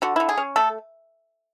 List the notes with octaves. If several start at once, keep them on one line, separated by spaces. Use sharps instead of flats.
D3 F#4
D3 E4
G#4
C#4
A3 A4